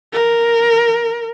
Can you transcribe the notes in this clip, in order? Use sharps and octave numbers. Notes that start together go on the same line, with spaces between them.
A#4